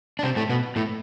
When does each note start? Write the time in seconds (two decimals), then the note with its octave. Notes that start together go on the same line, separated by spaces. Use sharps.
0.19 D4
0.23 C3 C4
0.36 A2 A3
0.49 B2 B3
0.76 A2 A3